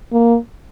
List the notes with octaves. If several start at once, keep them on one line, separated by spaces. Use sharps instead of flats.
A#3